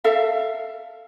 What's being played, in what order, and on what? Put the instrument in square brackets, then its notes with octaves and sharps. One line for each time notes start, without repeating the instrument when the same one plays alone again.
[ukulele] A4 E5 F5